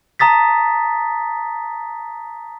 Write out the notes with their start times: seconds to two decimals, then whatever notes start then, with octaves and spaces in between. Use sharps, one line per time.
0.19 A5 A#5 D#6 A6 B6